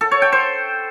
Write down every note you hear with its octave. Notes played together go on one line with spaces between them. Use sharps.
A4
C#5
G5
C5